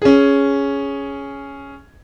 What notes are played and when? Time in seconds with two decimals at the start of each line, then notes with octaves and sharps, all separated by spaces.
0.02 C#4 G#4